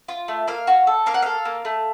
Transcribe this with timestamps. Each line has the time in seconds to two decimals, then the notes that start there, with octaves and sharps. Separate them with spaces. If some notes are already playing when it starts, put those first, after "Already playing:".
0.08 F4
0.28 A3
0.47 A#3 F5
0.67 F#4
0.87 A4
1.06 A#3 F5
1.14 F#5
1.22 A4 F5
1.45 A#3
1.65 A3